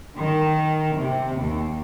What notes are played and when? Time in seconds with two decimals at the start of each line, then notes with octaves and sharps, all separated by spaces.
0.16 D#3
0.99 C3
1.36 D#2